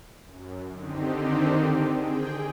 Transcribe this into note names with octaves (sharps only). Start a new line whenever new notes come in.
F#2
D3 D#3 C4 D#4 G4
G#4 G5